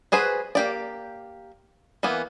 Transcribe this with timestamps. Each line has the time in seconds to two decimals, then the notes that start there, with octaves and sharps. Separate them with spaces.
0.12 F#4 G#4 B4 C5
0.55 A#3 G4 D5
2.03 E3 A#3 B3